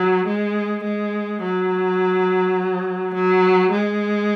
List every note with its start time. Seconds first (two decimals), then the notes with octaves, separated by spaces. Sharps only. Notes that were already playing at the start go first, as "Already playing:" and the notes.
Already playing: F#3
0.27 G#3
0.84 G#3
1.42 F#3
3.14 F#3
3.71 G#3